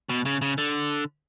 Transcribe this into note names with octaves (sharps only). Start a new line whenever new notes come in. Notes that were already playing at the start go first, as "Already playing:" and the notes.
B2
C#3
C#3
D3